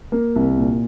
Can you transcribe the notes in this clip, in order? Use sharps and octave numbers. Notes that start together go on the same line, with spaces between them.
A#3
C2
A#2